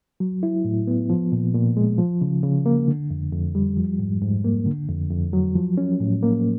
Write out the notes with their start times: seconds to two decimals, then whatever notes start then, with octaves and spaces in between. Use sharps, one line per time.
0.20 F#3
0.43 E4
0.65 A2
0.87 B3
1.10 F3
1.32 A#2
1.54 A#2
1.77 G#3
1.98 F3
2.21 C#3
2.43 C#3
2.66 A#3
2.88 D3
3.10 F2
3.32 F2
3.55 G3
3.77 F3
3.99 G#2
4.22 G#2
4.44 A#3
4.66 D3
4.89 F2
5.11 F2
5.33 F#3
5.56 F3
5.78 C#4
6.00 A2
6.23 A#3